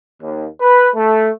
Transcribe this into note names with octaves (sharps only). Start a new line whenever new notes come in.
D#2
B4
A3